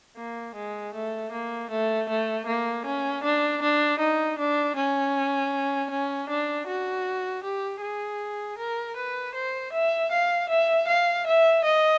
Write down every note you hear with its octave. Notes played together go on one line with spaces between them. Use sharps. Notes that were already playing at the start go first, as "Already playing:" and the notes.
A#3
G#3
A3
A#3
A3
A3
A#3
C#4
D4
D4
D#4
D4
C#4
C#4
D4
F#4
G4
G#4
A#4
B4
C5
E5
F5
E5
F5
E5
D#5